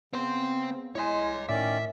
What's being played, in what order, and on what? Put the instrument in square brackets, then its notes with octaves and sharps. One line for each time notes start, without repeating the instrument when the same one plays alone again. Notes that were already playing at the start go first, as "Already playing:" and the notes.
[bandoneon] C#3 [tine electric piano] B3 [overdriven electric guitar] C4 C5
[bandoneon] G#3 [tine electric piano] E4 D#5 G#5 [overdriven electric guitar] C#5 C6
[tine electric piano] A2 D6 [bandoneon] D#3 C#4 D5 [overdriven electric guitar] E5